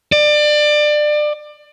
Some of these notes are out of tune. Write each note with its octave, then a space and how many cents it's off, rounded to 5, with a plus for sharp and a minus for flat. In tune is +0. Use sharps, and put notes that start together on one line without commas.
D5 +25